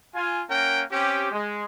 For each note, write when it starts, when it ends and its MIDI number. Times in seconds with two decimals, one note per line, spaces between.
0.15 0.42 65
0.15 0.42 80
0.49 0.82 58
0.49 0.82 61
0.49 0.82 70
0.49 0.82 78
0.49 0.82 79
0.91 1.29 60
0.91 1.29 61
0.91 1.29 67
1.30 1.63 56